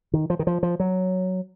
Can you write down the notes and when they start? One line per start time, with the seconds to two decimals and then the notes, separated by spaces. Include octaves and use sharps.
0.13 D#3
0.30 F3
0.39 D#3
0.47 F3
0.63 F3
0.80 F#3